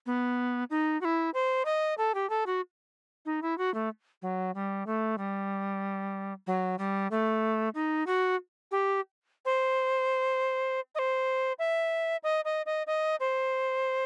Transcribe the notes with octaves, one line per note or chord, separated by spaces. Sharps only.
B3
D#4
F#4
E4
C5
D#5
A4
G4
A4
F#4
D#4
E4
F#4
A3
F#3
G3
A3
G3
F#3
G3
A3
D#4
F#4
G4
C5
D#5
C5
E5
D#5
D#5
D#5
D#5
C5